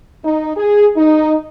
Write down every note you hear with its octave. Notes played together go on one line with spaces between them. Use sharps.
D#4
G#4
D#4